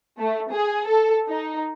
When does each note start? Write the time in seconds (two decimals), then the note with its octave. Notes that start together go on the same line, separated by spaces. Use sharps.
0.18 A3
0.51 G#4
0.86 A4
1.28 D#4